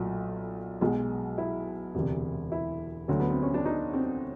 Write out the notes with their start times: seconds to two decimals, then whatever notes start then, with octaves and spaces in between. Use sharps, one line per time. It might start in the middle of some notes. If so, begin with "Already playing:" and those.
Already playing: B1 A#2 F#3 A3
0.81 B1 B2 G#3
1.38 E4
1.95 E1 D2 C3
2.52 E4
3.08 D2 D3 F#3 A3
3.20 B3
3.30 C4
3.43 C#4
3.54 D4
3.65 D#4
3.94 C4